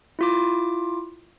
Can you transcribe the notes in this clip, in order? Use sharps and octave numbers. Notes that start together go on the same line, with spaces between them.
E4 F4 D6